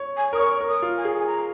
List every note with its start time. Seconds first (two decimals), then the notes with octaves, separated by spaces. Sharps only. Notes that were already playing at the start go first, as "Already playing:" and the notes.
Already playing: C#5
0.17 G#5
0.33 A#4 D#6
0.38 C#5 C#6
0.61 A#4
0.68 D#6
0.82 F4
0.97 G#5
1.05 G#4
1.19 G#5
1.27 A#5